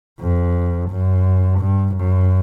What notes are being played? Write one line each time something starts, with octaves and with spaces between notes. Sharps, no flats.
F2
F#2
G2
F#2